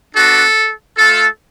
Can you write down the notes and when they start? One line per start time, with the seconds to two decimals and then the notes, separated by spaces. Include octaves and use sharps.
0.15 B3 D4 F#4 A4
0.97 A3 F4 A4